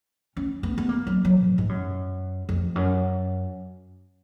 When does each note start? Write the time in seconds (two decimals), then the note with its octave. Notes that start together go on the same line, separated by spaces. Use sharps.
0.37 C#4
0.63 B3
0.78 B3
0.89 A#3
1.07 F#3
1.25 F#3
1.42 G#2
1.58 G#2
1.69 F#2
2.49 F2
2.76 F#2